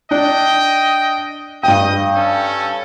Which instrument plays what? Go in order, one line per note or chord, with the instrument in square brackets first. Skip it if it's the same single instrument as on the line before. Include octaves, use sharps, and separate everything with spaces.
[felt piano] D4 [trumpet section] D#5 G5
[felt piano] G2 G5 [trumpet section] D#5 D#6
[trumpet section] C#4 A4